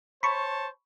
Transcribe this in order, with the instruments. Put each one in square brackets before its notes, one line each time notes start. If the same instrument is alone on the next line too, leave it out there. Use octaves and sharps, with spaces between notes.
[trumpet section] C5 C#5 A5 [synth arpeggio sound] B5 C#6